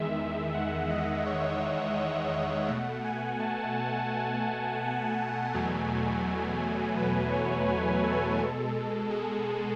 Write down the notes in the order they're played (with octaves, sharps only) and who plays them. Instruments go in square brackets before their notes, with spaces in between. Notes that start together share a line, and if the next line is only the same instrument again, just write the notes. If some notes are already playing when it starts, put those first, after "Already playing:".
Already playing: [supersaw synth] E2 D#3 G#3 E5
E5
F#5
D#5
C#5
D#5
E5
B2 A3 F#5
G#5
A5
A5
G#5
F#5
E2 B2 F#3 A3 G#5
B4
C#5
B4
A4
B2 G#3
G#4